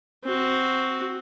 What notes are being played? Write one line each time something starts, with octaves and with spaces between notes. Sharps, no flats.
C4 F#4